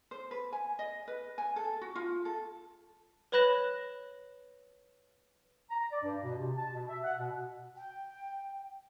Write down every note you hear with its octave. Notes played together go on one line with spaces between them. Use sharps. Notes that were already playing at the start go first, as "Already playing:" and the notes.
C5
B4
G#5
D#5
B4
G#5
A4
F#4
F4
A4
B4 C#5 B5 F#6 A#6 E7
A#5
D5
G2
B2
C3
A5
B2
E5
F#5
B2
G5